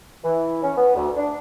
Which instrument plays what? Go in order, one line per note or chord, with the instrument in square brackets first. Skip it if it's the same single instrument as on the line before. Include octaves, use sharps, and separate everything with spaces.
[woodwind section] E3
C#4
B3
D2
D4